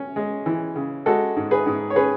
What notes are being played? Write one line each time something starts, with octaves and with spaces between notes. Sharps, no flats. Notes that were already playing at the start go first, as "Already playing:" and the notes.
Already playing: C#4
G#3
E3
C#3
G#3 F#4 A4
G#2
G#4 B4
G#2
C#5
C#4 G#4 B4